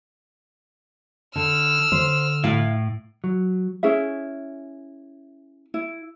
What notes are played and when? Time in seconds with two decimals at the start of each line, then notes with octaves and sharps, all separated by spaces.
1.36 D3 E6 F6
1.92 D3 C5
2.44 A2 E4 F5
3.24 F#3
3.83 C#4 E4 G#4 E5
5.74 E4